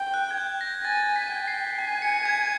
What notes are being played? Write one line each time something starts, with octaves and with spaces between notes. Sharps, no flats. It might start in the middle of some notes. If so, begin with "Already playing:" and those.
Already playing: G5
F#6
G#6
G6
A#6
G#5 A6
B6
G5
C7
G#5 B6
C#7
G#6